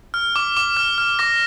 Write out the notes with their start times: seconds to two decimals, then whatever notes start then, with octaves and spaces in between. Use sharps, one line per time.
0.14 F6
0.36 D6
0.57 D6
0.77 F6
0.98 F6
1.19 D6 A#6